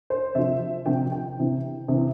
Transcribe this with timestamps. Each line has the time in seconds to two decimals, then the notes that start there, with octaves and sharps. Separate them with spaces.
0.10 C5
0.35 C3 F3 E5
0.86 C3 F3 G5
1.12 G5
1.37 C3 E3
1.88 C3 E3